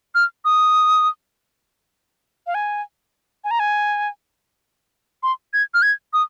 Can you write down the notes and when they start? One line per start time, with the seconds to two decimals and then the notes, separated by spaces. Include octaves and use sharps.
0.15 F6
0.45 D#6
2.47 F5
2.55 G#5
3.44 G#5
3.51 A#5
3.60 G#5
5.23 C6
5.53 G#6
5.74 F6
5.82 G#6
6.13 D#6